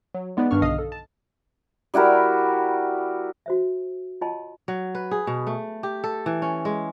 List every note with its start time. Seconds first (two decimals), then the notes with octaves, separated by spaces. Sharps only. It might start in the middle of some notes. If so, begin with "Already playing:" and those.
0.15 F#3
0.37 G#3 B3 D#4 B4 D5
0.51 G2 D#3 D4 C#6 F6
0.62 B1 D3 D#5 F5 D#6 F6
0.78 A4
0.92 A5
1.94 G3 E4 F#4 A#4
3.46 F#4 C5 E5
4.21 F4 C#5 D#5 G5 A5 C6
4.68 F#3
4.95 B4
5.11 G#4
5.27 B2
5.47 A3
5.83 G4
6.04 A4
6.26 E3
6.42 C#4
6.65 G#3